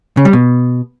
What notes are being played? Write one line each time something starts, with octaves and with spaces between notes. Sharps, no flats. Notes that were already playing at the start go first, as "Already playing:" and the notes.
C#3
G3
B2